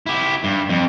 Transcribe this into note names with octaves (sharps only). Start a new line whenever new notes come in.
E4 G4
G2
F2